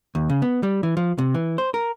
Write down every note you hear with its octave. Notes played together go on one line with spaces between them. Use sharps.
D#2
C#3
B3
G3
E3
F3
C3
E3
C5
A#4